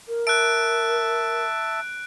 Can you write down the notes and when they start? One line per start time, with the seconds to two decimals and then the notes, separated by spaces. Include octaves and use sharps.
0.08 A#4
0.27 E5 A5 F#6 D7